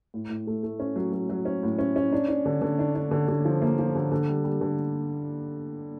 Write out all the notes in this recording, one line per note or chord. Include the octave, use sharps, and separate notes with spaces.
A2
A2
A3
A3
C#4
F#3
F#3
F#3
C#4
A2
C#4
C#4
D4
D4
D3
D3
D4
D4
D3
D3
F3
A#3
F3
D3
D3
G3
G3
D3